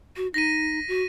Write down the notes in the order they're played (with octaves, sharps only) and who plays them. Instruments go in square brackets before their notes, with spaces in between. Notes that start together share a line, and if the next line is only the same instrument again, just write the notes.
[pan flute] F#4
[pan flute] D#4 [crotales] A#6 B6 D#7
[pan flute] F#4